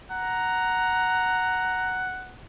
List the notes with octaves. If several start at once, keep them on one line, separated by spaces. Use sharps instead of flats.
F#5 A#5